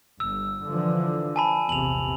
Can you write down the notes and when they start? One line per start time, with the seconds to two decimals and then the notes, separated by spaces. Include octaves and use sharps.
0.20 G1 E6
0.65 D3 E3 F3
1.36 G#5 A5 B5
1.69 A#1 E2 C3 F7 F#7